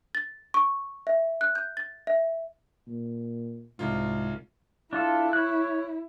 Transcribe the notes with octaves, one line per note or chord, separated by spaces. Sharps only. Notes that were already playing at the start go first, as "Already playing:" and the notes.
A6
C#6
E5
F#6
G6
A6
E5
A#2
C2 G#2 F4
D4 E4 F4 A4
C#5 F#6